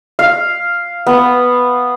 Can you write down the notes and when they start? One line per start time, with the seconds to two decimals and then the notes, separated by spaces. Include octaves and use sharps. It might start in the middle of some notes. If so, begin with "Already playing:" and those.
0.19 F5
1.07 B3